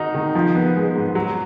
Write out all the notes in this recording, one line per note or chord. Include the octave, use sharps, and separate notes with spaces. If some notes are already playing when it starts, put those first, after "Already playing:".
Already playing: D#3 D#4 F#4
D#3
F3
B3
G#3
G#2
F#3